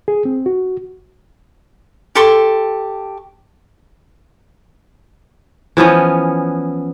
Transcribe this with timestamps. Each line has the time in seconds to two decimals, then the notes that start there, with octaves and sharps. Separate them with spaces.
0.08 G#4
0.25 C4
0.46 F#4
2.15 G4 A4 C6 C#6
5.77 E3 F3 B3 C#4